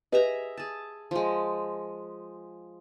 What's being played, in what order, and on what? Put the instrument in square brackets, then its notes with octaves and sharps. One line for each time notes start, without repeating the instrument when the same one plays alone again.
[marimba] G4 B4 D#5 [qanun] G#4 E5 A#5
[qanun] G#4 A5
F3 G#3